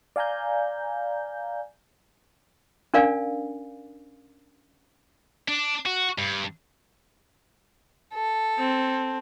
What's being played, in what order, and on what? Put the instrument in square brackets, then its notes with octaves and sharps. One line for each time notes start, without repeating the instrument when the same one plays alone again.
[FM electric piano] D5 F5 G#5 A#5 G6
[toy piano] C#4 D4 A#4 D5 F5 G#5
[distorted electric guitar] D4
F#4
G2
[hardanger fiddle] A4
[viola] C4